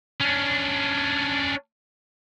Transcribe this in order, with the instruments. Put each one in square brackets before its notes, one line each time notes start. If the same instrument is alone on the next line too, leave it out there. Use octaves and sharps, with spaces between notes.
[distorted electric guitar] C#4 D4